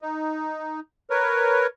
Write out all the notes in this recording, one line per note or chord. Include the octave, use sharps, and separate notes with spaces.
D#4
A#4 B4 C#5